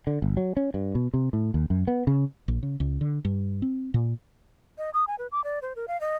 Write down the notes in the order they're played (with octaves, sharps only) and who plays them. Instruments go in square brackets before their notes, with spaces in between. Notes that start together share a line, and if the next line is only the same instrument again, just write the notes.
[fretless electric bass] D3
G1
F#3
C#4
G2
B2
C3
A2
D#2
F#2
B3
C#3
A#1
C#3
C#2
D3
G2
C4
A#2
[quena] D#5
D#6
G#5
B4
D6
D5
C5
A#4
F5
D#5